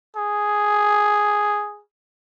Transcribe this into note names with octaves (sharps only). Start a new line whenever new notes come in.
G#4